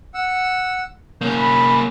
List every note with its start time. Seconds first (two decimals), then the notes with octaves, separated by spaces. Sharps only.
0.14 F#5 E6
1.21 A#3 C#4 G6
1.38 B5